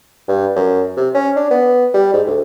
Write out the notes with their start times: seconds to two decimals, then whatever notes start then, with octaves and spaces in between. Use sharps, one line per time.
0.28 G2
0.56 F#2
0.97 C3
1.14 C#4
1.36 D4
1.50 B3
1.94 G3
2.13 G#2
2.27 D2